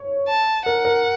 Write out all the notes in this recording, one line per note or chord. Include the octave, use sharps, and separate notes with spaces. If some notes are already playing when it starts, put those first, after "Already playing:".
Already playing: C#5
A5
A#4 F#5
A#4